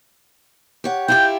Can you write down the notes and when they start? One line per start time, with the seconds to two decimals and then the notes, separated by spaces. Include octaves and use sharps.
0.84 G4 C#5 F#5
1.08 E4 F4 G4 G5